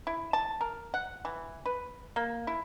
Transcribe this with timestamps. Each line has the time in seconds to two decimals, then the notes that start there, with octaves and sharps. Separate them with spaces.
0.07 E4
0.33 A5
0.61 A#4
0.94 F#5
1.25 E3
1.66 B4
2.16 A#3
2.47 E4